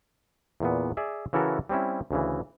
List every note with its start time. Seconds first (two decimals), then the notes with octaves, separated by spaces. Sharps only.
0.60 E2 A#2 B3
0.97 G#4 D5 E5
1.33 C#3 E3 E4 F#4 A4 A#4
1.69 G3 C4 C#4 E4
2.11 D2 C#3 E3